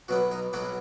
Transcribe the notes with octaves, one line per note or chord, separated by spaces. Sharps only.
B1 B2 F#3 B3 F#4
D#4
B1 B2 F#3 B3 F#4